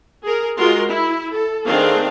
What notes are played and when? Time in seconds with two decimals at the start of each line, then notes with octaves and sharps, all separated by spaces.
0.22 G#4 A#4
0.57 G#3 F4 F#4 A#4 C6
0.87 E4
1.31 A4
1.67 D#3 A3 C4 D4 G#4 F5